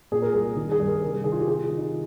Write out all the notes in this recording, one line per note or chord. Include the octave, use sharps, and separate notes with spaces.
A#2 G#4
A#4
C2 G#4
D#3
G#4
G2
A#4
C3 A#4
D#3 G#4
F4
G4
C3 G#4
F4
D#3
D#4